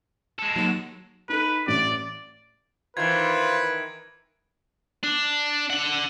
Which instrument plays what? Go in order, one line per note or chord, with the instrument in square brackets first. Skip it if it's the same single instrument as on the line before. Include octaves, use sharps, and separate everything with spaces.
[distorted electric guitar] G#3 A4
[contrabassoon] D#2 [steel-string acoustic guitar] F#3 F#4
[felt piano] D#4 A4 [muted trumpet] B4
[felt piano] A1 A2 [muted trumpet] D5
[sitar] D#3 E3 [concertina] F4 C5 [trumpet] B4 [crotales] G#6
[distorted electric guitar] D4
D3 F#5